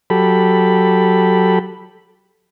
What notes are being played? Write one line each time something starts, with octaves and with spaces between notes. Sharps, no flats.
F#3 G4 A4 B5